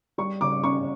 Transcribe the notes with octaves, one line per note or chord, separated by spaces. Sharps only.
G3 C#6
C#3 D6
C#4 C#6